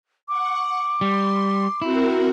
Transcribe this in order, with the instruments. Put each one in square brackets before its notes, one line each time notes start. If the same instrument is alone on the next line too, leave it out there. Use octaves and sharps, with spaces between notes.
[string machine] F#5 C#6 [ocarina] D6
[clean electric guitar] G3 [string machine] C6
[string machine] C4 F#4 A#4 [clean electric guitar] E4